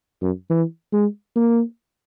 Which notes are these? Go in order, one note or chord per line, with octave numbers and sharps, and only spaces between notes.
F#2
E3
G#3
A#3